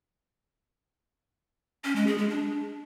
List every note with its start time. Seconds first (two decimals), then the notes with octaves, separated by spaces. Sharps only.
1.84 C#4
1.96 G#3
2.07 G#4
2.18 G#3
2.29 D4